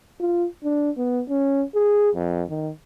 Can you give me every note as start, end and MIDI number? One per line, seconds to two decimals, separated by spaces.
0.20 0.47 65
0.64 0.90 62
0.97 1.22 59
1.29 1.63 61
1.75 2.10 68
2.15 2.43 41
2.50 2.71 51